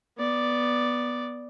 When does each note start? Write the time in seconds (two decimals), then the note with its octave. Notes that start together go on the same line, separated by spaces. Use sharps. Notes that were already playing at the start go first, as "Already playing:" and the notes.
0.17 B3 D5